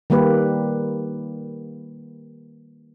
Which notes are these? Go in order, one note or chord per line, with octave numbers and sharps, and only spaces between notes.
D#3 G3 A#3 G4 B4